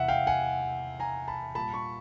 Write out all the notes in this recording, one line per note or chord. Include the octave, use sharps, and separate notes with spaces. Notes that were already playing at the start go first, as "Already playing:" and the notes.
Already playing: E2 C3 E3 G3 E5 F#5
F5 G5
F#5 G#5
G#5 A#5
A5 B5
A#2 G3 A5 B5
B5 C#6